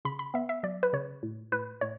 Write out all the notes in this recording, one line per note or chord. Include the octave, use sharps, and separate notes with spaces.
C#3 B5
B5
B3 E5
E5
F#3 D5
B4
C#3 C#5
A2
A2 B4
A2 C#5